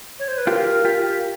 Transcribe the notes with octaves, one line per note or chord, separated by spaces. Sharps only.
C#5
C5
B4
F4 G4 A#4
F4 G4